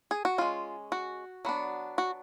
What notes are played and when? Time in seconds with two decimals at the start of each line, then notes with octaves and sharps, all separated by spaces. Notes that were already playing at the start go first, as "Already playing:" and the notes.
0.11 G#4
0.25 F#4
0.38 G#3 C#4 F4
0.92 F#4
1.45 F#3 B3 D4
1.98 F#4